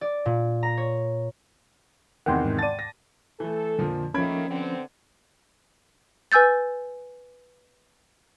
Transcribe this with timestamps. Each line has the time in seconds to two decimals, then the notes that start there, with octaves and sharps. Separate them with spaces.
0.01 D5
0.26 A#2
0.63 A#5
0.77 C#5
2.26 E2 C3 D#3 F#5 G5 C6
2.45 G#2
2.59 D5 A5 A6 D#7
2.79 A#6
3.40 E3 A3 A4
3.79 F2 A#2 D3 F3
4.14 D#3 F3 A3 A#3 C#4 B5 G#6 D7
4.48 D3 B3 C4
6.32 B4 G#5 E6 G6 A6